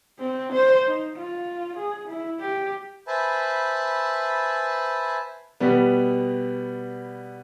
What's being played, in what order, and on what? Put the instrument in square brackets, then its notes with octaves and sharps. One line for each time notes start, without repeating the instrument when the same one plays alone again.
[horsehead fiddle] C4
C5
D#4
F4
G#4
E4
G4
[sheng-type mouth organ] B4 C5 E5 G#5 A5 B5
[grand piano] B2 G3 B3